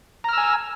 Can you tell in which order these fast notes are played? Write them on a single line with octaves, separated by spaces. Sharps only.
A#5 F6 E6 G#5